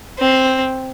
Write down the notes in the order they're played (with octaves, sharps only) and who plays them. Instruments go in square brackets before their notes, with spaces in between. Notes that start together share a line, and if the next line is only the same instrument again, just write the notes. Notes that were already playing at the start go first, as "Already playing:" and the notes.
[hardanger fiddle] C4